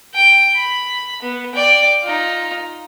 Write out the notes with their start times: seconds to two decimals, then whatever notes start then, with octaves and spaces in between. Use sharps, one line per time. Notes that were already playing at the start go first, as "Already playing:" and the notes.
0.15 G5
0.56 B5
1.22 B3
1.54 D5 G5
2.03 D#4 F4